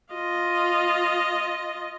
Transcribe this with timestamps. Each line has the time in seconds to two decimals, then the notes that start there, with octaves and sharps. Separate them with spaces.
0.13 F4 D#5